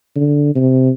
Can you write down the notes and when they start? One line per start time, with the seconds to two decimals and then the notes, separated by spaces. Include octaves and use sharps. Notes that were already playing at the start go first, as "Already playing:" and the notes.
0.16 D3
0.55 C3